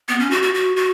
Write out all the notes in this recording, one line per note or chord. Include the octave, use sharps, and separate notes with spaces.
B3
C#4
F#4
F#4
F#4
F#4